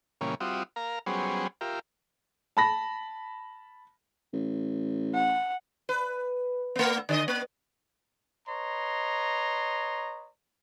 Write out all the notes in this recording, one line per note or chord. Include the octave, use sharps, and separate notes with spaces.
A#2 C#3 E3 G3 A#3 C#4
G3 C4 F4 F#4 E5 D#6
A#4 F5 A#5
F#3 G3 B3 C#4 G#4 C5
F4 G4 A#4 E5
A5 B5 A#6
A1
F#5
B4
A3 B3
D3 D5 D#5
A#3
B4 C#5 D#5 A#5 C6